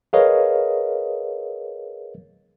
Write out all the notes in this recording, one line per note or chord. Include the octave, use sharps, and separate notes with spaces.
G#4 A#4 B4 C#5 D#5 F5